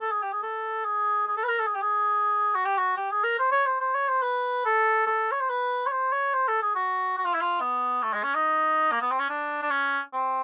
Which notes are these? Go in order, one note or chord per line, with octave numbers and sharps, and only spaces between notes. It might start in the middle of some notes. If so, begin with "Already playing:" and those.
A4
G#4
G4
G#4
A4
G#4
G#4
A4
B4
A#4
A4
G#4
G4
G#4
F#4
G4
F#4
G4
G#4
A#4
C5
C#5
C5
C5
C#5
C5
B4
A4
A4
C#5
C5
B4
C#5
C5
C#5
C5
A4
G#4
F#4
F#4
F4
E4
F4
B3
A3
G#3
C#4
D#4
A#3
B3
C4
C#4
D4
D4
C#4
C4